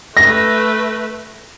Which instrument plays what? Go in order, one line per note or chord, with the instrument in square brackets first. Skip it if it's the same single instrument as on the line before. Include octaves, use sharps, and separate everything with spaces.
[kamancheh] A3 B4 [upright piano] A#6